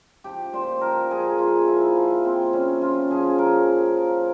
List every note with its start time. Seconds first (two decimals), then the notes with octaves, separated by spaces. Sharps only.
0.24 F3 G4
0.53 A#2 C5
0.81 F3 A#4
1.11 F3 G#4
1.38 F3 F4
1.67 F3 E4
1.96 F3
2.24 A#2 C4
2.53 A#2 C#4
2.81 F3 F4
3.11 F3 G#4
3.38 F3 A#4
3.67 F3
3.96 F3